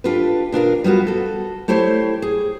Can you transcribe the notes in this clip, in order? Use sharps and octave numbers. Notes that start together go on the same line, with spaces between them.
D4 F4 G4 A4 B4
B2 D4 F4 A#4
G3 B3 F4 F#4
F#4 A4
A3 E4 G4 C5 C#5
G#4